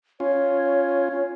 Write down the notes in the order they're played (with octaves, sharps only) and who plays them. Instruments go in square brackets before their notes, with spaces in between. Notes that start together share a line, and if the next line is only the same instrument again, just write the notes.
[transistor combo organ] C#4 F4 [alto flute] C#5